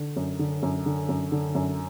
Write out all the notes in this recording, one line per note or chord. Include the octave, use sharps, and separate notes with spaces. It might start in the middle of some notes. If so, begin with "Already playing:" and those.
Already playing: D3
F#2
D3
F#2
D3
F#2
D3
F#2